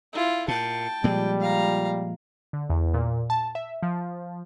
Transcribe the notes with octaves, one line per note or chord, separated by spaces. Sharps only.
E4 F4
A#2 G5 A5
A#2 F3 G3 G#3
F5 A#5
D3
E2
A#2
A5
E5
F3